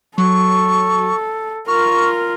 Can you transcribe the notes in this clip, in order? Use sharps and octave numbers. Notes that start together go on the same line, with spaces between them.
F#3 A4 C#6
F4 A#4 C#6 F6